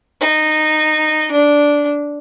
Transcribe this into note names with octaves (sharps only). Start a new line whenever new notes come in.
D#4
D4